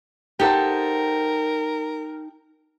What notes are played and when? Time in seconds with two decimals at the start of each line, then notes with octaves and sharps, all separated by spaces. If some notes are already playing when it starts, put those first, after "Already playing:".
0.40 D#4 G4 A4 A#4 C5 F#5